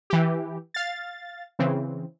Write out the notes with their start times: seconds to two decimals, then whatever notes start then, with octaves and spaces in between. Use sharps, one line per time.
0.10 E3 G4
0.74 F5 A6
1.59 C#3 E3 C4